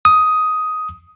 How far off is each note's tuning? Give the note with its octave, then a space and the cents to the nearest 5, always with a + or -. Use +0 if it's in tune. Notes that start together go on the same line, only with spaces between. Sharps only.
D#6 +10